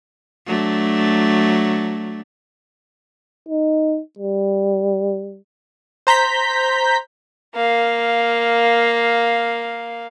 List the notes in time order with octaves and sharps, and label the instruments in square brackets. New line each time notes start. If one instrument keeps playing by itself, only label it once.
[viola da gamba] F#3 A3 D4
[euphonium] D#4
G3
[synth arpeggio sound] C5 A#5 G6 B6
[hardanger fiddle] A#3 F5